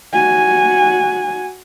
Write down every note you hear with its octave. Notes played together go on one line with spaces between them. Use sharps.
F#4 G#5